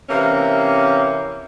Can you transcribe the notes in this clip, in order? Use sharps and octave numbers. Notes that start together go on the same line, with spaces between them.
C3 E3 A#3 C4 C#4